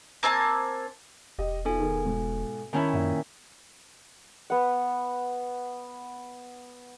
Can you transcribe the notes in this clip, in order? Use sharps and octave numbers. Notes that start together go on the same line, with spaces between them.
A#3 C4 G#5 A5
E1 G4 D#5
B3 D#4 F4 A4 G#5
D#3 G#4 A#4
G#2 B2
D#3 C#4 E4 G#5 A5 B5
F#2 A#2 G#5
B3 F#5